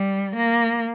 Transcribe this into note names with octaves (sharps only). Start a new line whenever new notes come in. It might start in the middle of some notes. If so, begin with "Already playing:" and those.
Already playing: G3
A#3